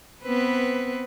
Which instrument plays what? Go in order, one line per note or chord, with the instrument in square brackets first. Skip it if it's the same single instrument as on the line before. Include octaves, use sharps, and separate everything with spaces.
[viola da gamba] B3 C4 B4